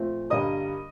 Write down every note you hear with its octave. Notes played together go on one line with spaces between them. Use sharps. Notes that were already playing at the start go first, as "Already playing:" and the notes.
Already playing: A#2 F3 A3 C4
G2 D3 G3 A#3 D#5 D#6